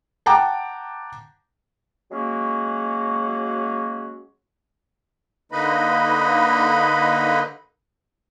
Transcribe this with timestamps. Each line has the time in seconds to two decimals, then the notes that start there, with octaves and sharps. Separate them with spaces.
0.26 F#5 G5 A5 A#5 D6
2.12 F#3 G#3 A#3 C#4 F#4
5.52 D3 A#3 D#4 B4 D#5 B5